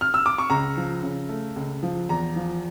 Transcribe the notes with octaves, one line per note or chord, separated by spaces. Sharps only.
F6
E6
D6
C#6
C#2 A#5
F3
C#3
A3
C#2
F3
E2 A#5
F3